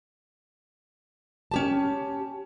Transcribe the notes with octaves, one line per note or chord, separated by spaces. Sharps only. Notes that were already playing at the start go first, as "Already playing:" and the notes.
C#4 G4 A5